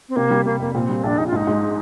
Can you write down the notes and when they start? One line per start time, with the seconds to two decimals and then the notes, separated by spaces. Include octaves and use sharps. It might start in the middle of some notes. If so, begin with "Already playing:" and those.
0.09 C4
0.16 C3 A#3
0.30 G3
0.45 C3 A#3
0.60 F2 A#3
0.75 A#2 C4
0.89 G3
1.03 A#1 D4
1.18 A#1 D#4
1.27 F4
1.32 G#2 D#4
1.47 G#2